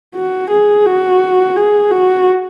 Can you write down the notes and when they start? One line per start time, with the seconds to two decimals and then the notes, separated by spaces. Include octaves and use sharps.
0.15 F#4
0.50 G#4
0.86 F#4
1.56 G#4
1.91 F#4